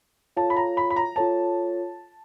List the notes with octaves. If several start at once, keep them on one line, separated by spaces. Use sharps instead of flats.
F4 A4 C#5 F5 A5
B5
A#5
B5
B5
A#5
F4 A4 C#5 F5 A5